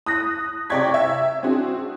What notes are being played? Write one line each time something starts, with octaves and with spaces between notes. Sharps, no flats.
D#6 F#6 A#6
C3 D5 G5 C#6 G#6 B6
E5
C4 D4 F#4 G#4